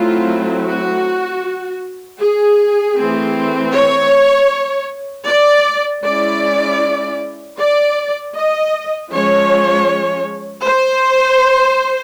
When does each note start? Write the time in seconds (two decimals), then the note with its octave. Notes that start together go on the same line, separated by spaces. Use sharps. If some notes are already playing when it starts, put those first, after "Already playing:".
Already playing: F#3 A3 C4 E4 F4
0.66 F#4
2.20 G#4
2.96 E3 A3 C4
3.73 C#5
5.27 D5
6.04 G#3 C#4 E4 D5
7.58 D5
8.35 D#5
9.11 F3 G#3 C#4 C#5
10.65 C5